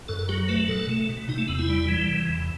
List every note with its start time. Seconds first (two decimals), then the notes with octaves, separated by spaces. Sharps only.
0.08 F#2 A4
0.19 A4
0.29 F#3 G4
0.48 A3 B4
0.68 B2 A4
0.89 A3
1.09 B2
1.29 C3 D#4
1.38 A3
1.48 E2 B3
1.59 E4
1.68 G3
1.88 E3
2.08 C3
2.28 E2